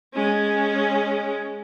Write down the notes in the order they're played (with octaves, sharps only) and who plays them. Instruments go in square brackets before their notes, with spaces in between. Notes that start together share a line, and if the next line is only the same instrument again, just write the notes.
[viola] G#3 C#4